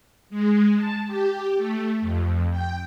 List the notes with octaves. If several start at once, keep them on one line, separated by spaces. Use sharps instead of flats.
G#3
A5
G4
A3
F2
G5